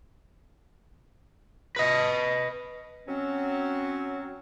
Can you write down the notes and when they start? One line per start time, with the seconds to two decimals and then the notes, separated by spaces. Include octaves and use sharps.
1.76 B4 D#5
3.07 F#3 C4 C#4